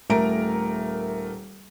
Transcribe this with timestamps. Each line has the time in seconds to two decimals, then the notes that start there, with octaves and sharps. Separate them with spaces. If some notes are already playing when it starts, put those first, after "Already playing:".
0.10 D#1 A3 A#4 A#5 D7